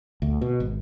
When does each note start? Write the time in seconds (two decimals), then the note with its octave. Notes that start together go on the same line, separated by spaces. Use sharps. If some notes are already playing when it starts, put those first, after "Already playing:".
0.22 D2
0.41 B2
0.60 G#1